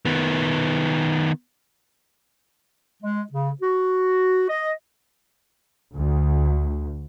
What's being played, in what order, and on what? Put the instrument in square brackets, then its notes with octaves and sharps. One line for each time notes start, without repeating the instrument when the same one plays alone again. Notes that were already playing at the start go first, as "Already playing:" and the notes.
[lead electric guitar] D#3 B3
[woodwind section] G#3
C#3
F#4
D#5
[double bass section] D2